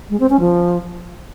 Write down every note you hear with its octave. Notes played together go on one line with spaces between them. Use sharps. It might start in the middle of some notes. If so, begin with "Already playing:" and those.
G#3
C4
C#4
F3